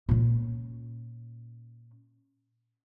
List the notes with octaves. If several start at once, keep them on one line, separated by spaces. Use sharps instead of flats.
A#2 C#4